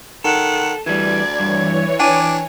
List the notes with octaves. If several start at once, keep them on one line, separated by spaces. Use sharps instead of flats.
D#3 A4 F#5
D2 E3 G3 D5 G#6
G2 E3 C#5
D4 G5 G#5 D6